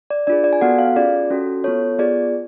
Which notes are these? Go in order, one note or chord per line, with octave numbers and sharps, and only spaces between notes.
D5
D4 F4 G#4 D5
D5
G#5
B3 F#4 A4 F#5
F5
C#4 F4 G#4 D5
C#4 F#4 A4
B3 F4 A4 C#5
B3 F4 G#4 D5